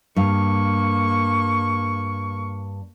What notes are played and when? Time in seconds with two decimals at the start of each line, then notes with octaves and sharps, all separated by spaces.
0.16 G2 A#3 F5 C#6